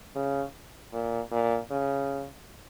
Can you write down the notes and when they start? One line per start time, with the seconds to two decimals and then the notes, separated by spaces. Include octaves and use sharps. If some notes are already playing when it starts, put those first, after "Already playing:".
0.15 C#3
0.93 A#2
1.31 A#2
1.70 C#3